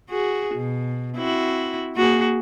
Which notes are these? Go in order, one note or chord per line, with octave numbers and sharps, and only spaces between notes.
F#4 G#4
B2
C4 E4 F#4
A#3 F#4 G#4